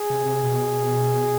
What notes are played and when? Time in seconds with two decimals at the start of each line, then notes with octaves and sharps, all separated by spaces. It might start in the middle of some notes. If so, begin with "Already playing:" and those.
Already playing: G#4
0.10 C3
0.26 C3
0.43 B2